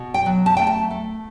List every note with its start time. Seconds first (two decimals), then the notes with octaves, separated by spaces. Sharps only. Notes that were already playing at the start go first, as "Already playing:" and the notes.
Already playing: B2
0.14 G5
0.26 F#3
0.46 A5
0.57 A3 G5
0.67 A5
0.91 A3